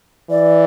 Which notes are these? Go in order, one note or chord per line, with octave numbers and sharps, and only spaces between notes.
E3 D5